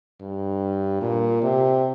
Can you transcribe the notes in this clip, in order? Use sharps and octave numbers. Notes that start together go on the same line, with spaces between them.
G2
A#2
C3